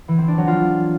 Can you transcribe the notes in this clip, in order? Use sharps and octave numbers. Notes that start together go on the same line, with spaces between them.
E3
C4
D4
F#3
F4